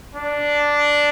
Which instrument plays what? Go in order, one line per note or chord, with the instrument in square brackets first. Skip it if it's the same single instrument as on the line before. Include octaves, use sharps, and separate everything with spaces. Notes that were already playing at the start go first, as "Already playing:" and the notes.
[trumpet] D4